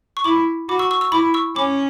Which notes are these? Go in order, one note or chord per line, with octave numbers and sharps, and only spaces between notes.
C#6
E4 B5 D6
F#4 B5 D6
C#6 E6
C#6 E6
C#6 E6
E4 B5 D6
C#6 E6
C#4 B5 D6